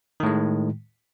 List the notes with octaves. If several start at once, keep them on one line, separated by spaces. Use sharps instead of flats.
A2 D#3 G#3